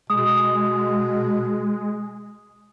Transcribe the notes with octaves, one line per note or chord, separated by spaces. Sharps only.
B2 G#3 D#6